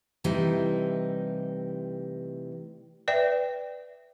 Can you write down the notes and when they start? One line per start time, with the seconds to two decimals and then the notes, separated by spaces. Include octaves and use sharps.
0.24 A2 C3 E3 G3 D#4
3.08 B4 D5 E5 G5